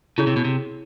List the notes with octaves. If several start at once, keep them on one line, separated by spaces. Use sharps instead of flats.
C#3 E4 G#4 C#5
C3
B2
C3